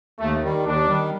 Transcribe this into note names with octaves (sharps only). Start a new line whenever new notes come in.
D#2 A3
D#3 G3
D#2 D4
D#3 G3